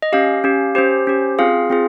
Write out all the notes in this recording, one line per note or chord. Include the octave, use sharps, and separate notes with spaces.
D#5
C#4 G4 F5
C#4 G4
C#4 G4 C5
C#4 G4
C4 F4 G#4 F5
C4 F4 G#4